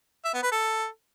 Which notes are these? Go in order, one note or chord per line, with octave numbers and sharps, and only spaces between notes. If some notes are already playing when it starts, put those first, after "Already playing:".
E5
B3
B4
A4